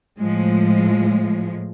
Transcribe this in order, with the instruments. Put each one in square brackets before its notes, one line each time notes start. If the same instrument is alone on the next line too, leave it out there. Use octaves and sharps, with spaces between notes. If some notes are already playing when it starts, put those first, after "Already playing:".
[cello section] A2 F3 G#3